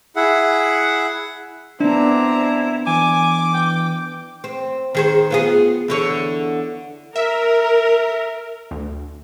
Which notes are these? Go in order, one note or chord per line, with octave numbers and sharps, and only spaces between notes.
E4 G#4 E5 F#5
B3 C4 D4 E4 A#5
E3 G#5 D6
G5
C4
D#3 G#4 C5
B3 F4 G#4
E2 D3 C#5
A#4 E5
D2